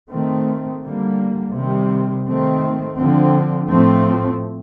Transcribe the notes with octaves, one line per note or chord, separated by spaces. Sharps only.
D#3 A3 C4
D3 G3 A#3
C3 D#3 G3 C4
D#3 A3 C4
D3 F3 C4
A2 F3 A3 C4